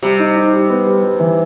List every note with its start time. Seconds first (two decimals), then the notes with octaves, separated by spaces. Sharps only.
0.03 C3 G3
0.19 D#4
0.36 D#4
0.53 G3
0.70 B3
0.86 G3
1.03 G3
1.20 E3